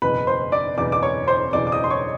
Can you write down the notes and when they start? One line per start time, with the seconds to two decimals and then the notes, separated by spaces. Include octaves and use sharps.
0.02 F#1 E2 B2 B4 B5
0.27 C5 C6
0.52 D5 D6
0.78 F#1 E2 B2 D5 D6
0.92 D6
1.02 C#5 C#6
1.28 C5 C6
1.53 F#1 E2 B2 D5 D6
1.67 D6
1.72 D#5 D#6
1.84 C6
1.90 C#5 C#6